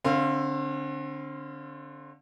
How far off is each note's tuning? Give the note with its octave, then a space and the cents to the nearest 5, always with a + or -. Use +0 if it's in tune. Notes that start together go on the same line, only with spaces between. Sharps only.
D3 +0 C4 +35 F5 -10